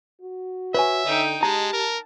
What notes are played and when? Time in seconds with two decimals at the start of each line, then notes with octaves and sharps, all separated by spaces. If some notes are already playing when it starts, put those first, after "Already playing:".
0.21 F#4
0.74 B4 C#5 E5 G#5
1.06 D3 D#4 G5
1.43 G#3 G4 A5 A#5
1.73 A#4